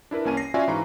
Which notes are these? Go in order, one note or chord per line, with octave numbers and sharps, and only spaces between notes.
D4 E4 A#4 B4
C2 A#3 C#4 G#5 A5 D#7
A#6 C7
C#4 F4 F#4 D5 E5 G#5
G#2 E3 F5 A#5 B5 C#6